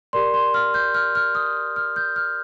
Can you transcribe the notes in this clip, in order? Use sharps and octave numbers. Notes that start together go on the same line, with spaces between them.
G4 A#4 D5 C6
C6
F6
G6
F6
F6
D#6
F6
G6
F6